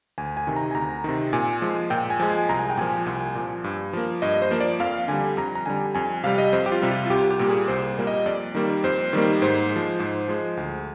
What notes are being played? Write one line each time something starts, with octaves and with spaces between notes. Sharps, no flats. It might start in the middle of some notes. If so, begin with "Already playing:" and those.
D2 G#5
G#5
C3 D#3
A#5
G#5
D2 A#5
C3 D#3
A#2 G#5
F3 G#3
A#2 G5
G#5
F3 G#3
G#5
C2 A#5
G#5
G5
A#2 F3 G#5
C2
A#2 F3
G2
F3 A#3
G2 D#5
C5
F3 A#3
D5
F2 F5
D3 G3 G#5
F2 A#5
A#5
D3 G3 G#5
F2 G#5
C3 G3 F5
D#5
F2 C5
G4
F4
C3 G3
F4
F4
C2 G4
G4
A#2 G3 A#3
G#4
C2 C5
A#2 G3 A#3
D#5
F2 D5
D#3 G3 A#3
F2 C5
D#3 G3 A#3
G#2 C5
G#3
F3
G#2
F3 G#3
D2